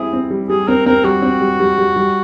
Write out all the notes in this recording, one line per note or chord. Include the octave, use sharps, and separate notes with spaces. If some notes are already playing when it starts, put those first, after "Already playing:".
Already playing: G3 C4 E4 G#4
C4
G3
G3 G#4
C4 A#4
C4 A#4
G3 F#4
C4
G3
G3
G3
G3